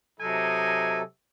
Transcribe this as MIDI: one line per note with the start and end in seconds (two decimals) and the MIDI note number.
0.20 1.03 48
0.20 1.03 54
0.20 1.01 56
0.20 1.01 63
0.20 1.03 69
0.20 1.01 80